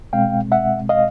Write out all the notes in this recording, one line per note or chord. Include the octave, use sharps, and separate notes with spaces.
B2 G#3 C4 F5 G5
E5 F#5
D#5 F5